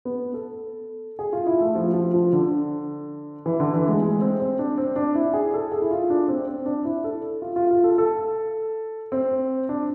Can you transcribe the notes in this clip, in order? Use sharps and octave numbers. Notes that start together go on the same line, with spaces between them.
B3
A4
G#4
F4
E4
A3
F3
F3
F3
D3
E3
D3
E3
G#3
G#3
C4
C4
D4
C4
D4
E4
G#4
A4
G#4
E4
F4
D4
C4
C4
D4
E4
A4
F4
F4
F4
A4
A4
C4
D4